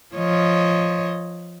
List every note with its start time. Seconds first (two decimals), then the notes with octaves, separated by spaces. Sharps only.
0.15 F3 C#5 D#5